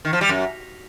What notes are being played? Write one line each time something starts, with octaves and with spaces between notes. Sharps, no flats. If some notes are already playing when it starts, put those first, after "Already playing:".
D#3
F3
G3
F#2